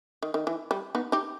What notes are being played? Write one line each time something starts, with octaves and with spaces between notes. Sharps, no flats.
D#3
D#3
E3
G3
B3 D#4
D#4 G4